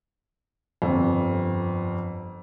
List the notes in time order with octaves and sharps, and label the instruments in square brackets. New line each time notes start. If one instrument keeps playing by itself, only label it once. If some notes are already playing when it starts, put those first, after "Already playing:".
[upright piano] G1 F2